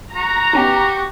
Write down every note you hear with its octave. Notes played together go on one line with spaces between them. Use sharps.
F#4 A#5
B3 C#4 D#4 G4